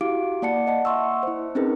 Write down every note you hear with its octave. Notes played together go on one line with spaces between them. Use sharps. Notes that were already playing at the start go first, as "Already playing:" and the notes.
E4 F#4 G4 F5 D6 D7
A#3 D5 F#5 A5 C#7
D#5 F#5 A5
E5 F#5 C6 C#6 E6
E4 C5
C4 C#4 D#4 G#4 A#4 B4